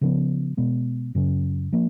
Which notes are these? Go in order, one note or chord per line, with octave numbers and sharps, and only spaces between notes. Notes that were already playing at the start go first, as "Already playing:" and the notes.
C#3 F3 B3
B2 G#3 B3
F#2 C#3 F#3 C#4
F3 A#3